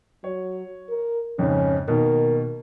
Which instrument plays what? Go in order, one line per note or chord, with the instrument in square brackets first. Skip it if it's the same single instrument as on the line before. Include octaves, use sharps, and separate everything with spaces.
[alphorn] F#3 [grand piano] C#5
[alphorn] A#4
[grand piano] F2 G#2 C#3 [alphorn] C#4
[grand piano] B2 D#3 A#3 [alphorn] A#4